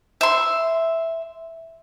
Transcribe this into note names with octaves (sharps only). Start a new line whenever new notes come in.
E5 C6